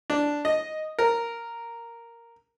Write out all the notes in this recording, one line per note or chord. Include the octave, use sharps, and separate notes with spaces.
D4
D#5
A#4